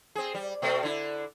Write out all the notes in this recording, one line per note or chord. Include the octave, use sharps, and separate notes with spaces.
C4 G#4
G3
B2 A3 C4
D3 E4